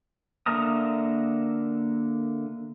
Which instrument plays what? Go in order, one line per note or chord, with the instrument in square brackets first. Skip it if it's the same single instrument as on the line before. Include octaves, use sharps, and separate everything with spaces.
[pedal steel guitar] D3 A#3 E5 A#5 D#6